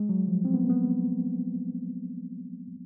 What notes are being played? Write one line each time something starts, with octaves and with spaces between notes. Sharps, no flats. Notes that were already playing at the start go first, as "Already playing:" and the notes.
Already playing: G#3
F#3
F3
C4
B3
A#3
B3